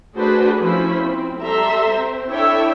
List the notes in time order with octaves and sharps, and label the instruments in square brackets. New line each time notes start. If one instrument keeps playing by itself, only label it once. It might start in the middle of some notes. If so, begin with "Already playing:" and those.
[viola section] A3 D4 F#4 G#4 B4 C5
F3 C#4 E4 C5 B5
C4
G3 A4 E5 A#5 C6
C4 C5
D4 E4 A4 C#5 E5 G5